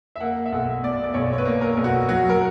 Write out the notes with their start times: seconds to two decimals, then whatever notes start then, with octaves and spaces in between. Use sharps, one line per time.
0.16 E5
0.20 A#3 F#5
0.46 E5
0.52 B1 F#5
0.83 B2 D5
1.04 D5
1.14 B1 C#5
1.33 C#5
1.38 B4
1.45 A#3
1.61 A#4
1.77 B1
1.84 F#4
2.08 F#3 F#4
2.29 A#4